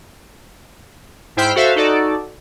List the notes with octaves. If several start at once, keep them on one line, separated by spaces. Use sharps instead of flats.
G#2 E4 C5 G5 F6 B6
F#4 A4 C5 E5 F5
D#4 F#4 A4 D5